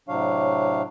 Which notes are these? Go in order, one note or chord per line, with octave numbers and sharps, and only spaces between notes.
A2 C3 F#3 D4 C#5 F5